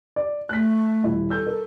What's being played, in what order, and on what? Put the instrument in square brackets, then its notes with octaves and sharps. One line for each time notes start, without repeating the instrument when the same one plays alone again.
[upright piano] D5
[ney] A3 [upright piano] F#6 B6
[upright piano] D#1 E4
[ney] A4 [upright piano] E6 G6
[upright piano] A#4